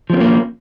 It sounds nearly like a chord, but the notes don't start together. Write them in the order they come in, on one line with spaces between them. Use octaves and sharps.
F3 C4 C#4 A#3